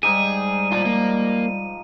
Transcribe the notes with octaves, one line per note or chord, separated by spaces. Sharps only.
G#2 G3 D#4 G4 G#4 D#7
F3 F4 D5 A#5
A#3